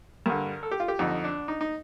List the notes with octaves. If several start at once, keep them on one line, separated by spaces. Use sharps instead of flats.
G2 D3 A#4
A4
G4
F4
G4
F2 D3 D#4
D4
D#4
D#4